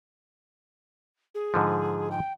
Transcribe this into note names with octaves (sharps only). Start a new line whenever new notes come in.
G#4
G#2 D3 F3
G5